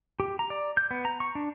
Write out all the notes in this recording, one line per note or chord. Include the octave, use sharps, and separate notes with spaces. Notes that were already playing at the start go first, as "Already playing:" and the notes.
G4
A#5
D5
G6
B3
A#5
C#6
D4